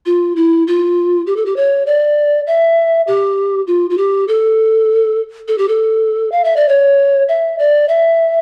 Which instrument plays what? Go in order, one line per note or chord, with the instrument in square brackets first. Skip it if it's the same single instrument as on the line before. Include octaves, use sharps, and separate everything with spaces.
[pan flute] F4
E4
F4
G4
A4
G4
C#5
D5
E5
G4
F4
F4
G4
A4
A4
G4
A4
F5
E5
D5
C#5
E5
D5
E5